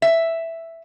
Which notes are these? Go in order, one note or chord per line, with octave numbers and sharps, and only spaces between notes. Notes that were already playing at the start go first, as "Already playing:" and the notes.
E5